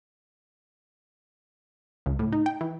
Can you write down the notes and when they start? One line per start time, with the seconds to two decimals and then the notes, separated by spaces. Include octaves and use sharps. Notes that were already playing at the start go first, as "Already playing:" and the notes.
2.06 C#2
2.19 A2
2.33 D#4
2.46 G5
2.61 E3